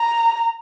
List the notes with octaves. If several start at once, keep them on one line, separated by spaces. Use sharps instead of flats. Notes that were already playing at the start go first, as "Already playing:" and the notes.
Already playing: A#5